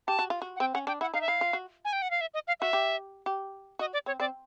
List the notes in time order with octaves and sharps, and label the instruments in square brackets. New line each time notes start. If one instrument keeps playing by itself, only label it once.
[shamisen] G4 [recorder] A5
[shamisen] F#4
F4
F#4
[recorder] F#5
[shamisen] C4 [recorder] G5
[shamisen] C#4 [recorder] F#5
[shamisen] D4 [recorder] G5
[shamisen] E4 [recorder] F#5
[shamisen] D#4 [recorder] F5
[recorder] E5
[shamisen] E4 [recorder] F5
[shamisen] F4
F#4
[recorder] G#5
G5
F#5
F5
E5
D#5
F5
[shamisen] F#4 [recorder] E5
[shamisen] G4
G4
[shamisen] F#4 [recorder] D#5
[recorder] D5
[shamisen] C4 [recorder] C#5
[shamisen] C4 [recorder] D5